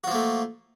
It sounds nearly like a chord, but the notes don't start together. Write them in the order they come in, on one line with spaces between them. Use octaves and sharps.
F#4 F3 A#3 A3